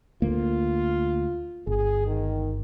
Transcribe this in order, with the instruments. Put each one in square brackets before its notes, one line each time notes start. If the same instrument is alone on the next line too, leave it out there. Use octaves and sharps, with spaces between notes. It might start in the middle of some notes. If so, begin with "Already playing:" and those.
[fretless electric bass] D2 A#3 [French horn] F4
[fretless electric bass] G1 [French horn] G#4
[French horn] D#3